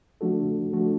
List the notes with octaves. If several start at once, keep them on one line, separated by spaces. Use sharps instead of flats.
F3 A3 D4 F#4 A4
F3 A3 D4 F#4 A4